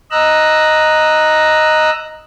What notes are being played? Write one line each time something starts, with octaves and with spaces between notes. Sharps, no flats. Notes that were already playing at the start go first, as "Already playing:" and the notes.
D#5 A#5 E6 F#6